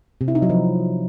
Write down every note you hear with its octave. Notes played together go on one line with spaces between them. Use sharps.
C3
E4
D#4
F#3
F3